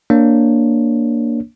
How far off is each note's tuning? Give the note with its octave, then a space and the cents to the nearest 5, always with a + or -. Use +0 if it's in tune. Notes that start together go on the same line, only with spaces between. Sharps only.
A#3 +0 D4 +0 C#5 +0